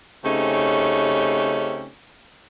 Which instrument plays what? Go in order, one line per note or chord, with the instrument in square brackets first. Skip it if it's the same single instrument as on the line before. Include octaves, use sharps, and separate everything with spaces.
[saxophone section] C#3 A3 C4 C#4 D#4 G4